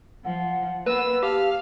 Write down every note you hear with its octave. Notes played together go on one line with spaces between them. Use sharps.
F3 F#5
A#3 B3 B4 E6
G4 F5 A5